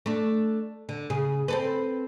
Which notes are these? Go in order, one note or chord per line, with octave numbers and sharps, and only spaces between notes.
A3 D4
D3
C#3 G#4
C4 A4 B4